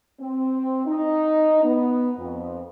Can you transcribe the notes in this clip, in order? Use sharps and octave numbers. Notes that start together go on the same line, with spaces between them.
C4
D#4
B3
F2